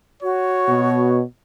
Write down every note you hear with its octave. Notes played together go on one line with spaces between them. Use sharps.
F#4 C#5
B2